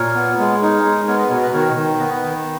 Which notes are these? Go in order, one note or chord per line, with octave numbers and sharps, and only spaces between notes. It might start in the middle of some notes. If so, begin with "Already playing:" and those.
Already playing: A#2 A#4 C#5
B3
G#3
D#4 A#4 C#5
G#3
B3 A#4 C#5
B4 D#5
B2 A#4 C#5
B4 D#5
D#3 A#4 C#5
D#3
B3 B4 D#5
D#3